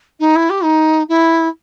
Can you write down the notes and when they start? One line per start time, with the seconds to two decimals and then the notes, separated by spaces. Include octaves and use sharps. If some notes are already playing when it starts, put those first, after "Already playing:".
0.20 D#4
0.36 E4
0.50 G4
0.64 D#4
1.09 E4